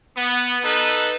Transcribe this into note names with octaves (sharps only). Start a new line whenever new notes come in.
B3
D#4 A4 B4